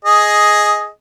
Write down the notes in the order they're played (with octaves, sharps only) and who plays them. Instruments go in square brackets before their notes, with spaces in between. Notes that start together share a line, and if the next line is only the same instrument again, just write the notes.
[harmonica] G#4 D#5